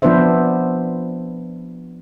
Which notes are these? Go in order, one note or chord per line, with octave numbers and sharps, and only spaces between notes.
F3 B3 D4 B4 C5 E5